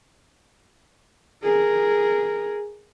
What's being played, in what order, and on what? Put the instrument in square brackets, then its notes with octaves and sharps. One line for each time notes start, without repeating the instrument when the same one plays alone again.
[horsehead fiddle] G#4 A#4